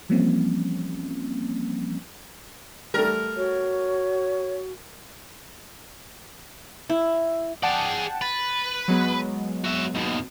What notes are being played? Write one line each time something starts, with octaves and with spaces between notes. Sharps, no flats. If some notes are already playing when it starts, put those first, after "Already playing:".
E3 F3 G3 A#3 C4 C#4
G3 A3 A#4
F#4 C#5
E4
G#4 D5 F#5 G5 A5
B4 A6
F#3 G#3 B3
F#4 E5
D#2 B2